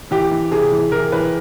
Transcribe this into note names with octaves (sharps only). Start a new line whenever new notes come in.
E3 G4
E3
C3 G#4
E3
E3 A#4
E3 B4